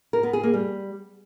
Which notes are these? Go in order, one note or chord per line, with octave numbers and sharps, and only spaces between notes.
A#4
B3
G#4
A#3
G3